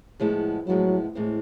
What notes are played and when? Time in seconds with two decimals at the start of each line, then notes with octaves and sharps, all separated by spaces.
0.20 A2 F3 G#3 B3 E4
0.67 A2 F3 F#3 G#3 B3 E4
1.15 A2 E3 G#3 C4 E4